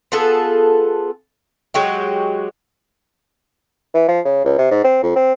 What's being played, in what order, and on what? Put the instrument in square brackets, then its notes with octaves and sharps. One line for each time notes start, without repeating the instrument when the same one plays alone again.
[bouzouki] B3 F4 G#4 A4
F#3 G#3 F#4 G4
[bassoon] E3
F3
C#3
C#2
C3
G#2
C4
F2
C4